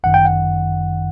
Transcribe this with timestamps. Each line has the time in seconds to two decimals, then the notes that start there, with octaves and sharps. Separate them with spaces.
0.04 G1 F#2 D#3 F#5
0.14 G5
0.25 F#5